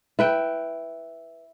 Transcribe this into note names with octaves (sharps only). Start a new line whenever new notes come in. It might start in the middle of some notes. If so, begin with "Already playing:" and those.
E4 B4 G5